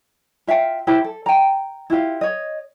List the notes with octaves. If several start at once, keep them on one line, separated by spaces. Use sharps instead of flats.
F4 E5 F5 G5
E4 G4 C5 B5
A4
G5 A#5
E4 F4 G4 F5
C#5 D#5